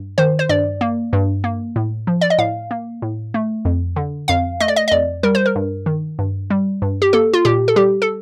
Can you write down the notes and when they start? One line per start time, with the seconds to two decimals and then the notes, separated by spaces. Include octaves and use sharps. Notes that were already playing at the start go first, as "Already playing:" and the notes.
Already playing: G2
0.18 D#3 C5
0.39 C5
0.49 G2 D5
0.81 A#3
1.13 G2
1.44 A#3
1.76 A2
2.07 F3
2.21 D5
2.30 D#5
2.38 A2 F5
2.71 A#3
3.02 A2
3.34 A3
3.65 F2
3.96 D3
4.28 F2 F5
4.60 A3 D#5
4.68 D5
4.76 D#5
4.88 D#5
4.91 F2 D5
5.23 G3 A#4
5.35 C5
5.46 A#4
5.56 G2
5.86 D#3
6.19 G2
6.50 G3
6.82 G2
7.02 G4
7.13 A#3 A4
7.33 F4
7.45 A#2 G4
7.68 A4
7.76 G3 G4
8.02 A4